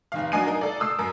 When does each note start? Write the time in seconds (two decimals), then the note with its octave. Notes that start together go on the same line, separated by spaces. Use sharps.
0.12 F1 D#3 F5
0.32 F#3 D4 D#5 G#5 C7 D#7
0.47 D#4 A#4
0.61 A4 D5
0.80 D#6 E6 C7
0.99 F#2 A#4